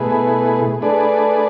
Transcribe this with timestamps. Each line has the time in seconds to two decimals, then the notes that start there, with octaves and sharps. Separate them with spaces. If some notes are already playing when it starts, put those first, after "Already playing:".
Already playing: B2 A3 E4 G#4 B4
0.81 A3 D4 G#4 B4 D5